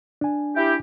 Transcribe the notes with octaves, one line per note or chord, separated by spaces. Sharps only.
D4 G#5
E4 G4